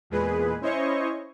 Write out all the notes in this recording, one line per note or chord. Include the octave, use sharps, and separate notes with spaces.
E2 A#2 G#3 G#4 B4
C#4 E4 C5 C#5 D#5 C#6